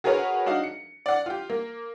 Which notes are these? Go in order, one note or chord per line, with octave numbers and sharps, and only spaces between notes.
F#4 G#4 A#4 B4 C#5 F#5
D4 D#4 F#4 F5
C#7
D5 F#5
F4 G4
A#3